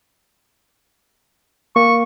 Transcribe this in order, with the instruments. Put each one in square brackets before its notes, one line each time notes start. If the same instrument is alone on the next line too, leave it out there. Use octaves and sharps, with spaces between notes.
[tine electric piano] A#3 [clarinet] C#6